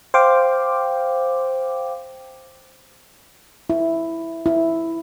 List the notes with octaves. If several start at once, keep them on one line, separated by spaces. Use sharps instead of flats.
C5 F5 G5 D6
E4
E4